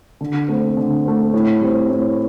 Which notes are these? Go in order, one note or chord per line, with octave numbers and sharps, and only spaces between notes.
D3
A3 C4
D3
A3 C4
A2
G3 C4
A2